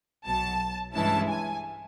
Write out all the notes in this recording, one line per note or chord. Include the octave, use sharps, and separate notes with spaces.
B1 B2 F#3 A5
G2 E3 G#3 C#4 E4 A5
G#5